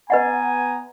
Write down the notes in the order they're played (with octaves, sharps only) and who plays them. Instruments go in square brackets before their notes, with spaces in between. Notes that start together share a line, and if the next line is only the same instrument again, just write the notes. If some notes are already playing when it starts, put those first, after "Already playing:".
[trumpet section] B3 G#5 A#5 [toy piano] B4 D#5 F#5